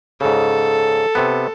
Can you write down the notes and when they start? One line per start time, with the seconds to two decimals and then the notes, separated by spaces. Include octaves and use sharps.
0.21 G#2 C#3 A4
1.15 C3 B3